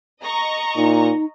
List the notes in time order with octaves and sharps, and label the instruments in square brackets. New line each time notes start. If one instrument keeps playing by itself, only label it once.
[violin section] D#5 A#5 C#6
[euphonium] A#2 [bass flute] D#4